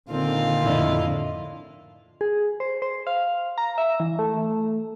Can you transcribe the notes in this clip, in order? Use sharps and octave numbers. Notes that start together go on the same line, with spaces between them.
A#2 D3 D#3 C4 F4 F5
F2 A2 D3 E4 D#5
G#4
C5
C5
F5
A#5
E5
E3
A3